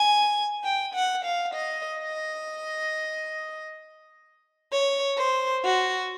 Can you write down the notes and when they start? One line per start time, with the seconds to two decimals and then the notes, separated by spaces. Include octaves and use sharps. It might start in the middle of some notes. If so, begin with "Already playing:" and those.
Already playing: G#5
0.64 G5
0.94 F#5
1.24 F5
1.53 D#5
1.99 D#5
4.72 C#5
5.17 C5
5.63 F#4